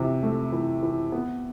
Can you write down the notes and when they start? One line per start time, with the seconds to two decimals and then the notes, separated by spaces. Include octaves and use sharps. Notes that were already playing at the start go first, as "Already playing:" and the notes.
Already playing: C3 E3
0.23 A3
0.52 E3
0.83 E3
1.12 B3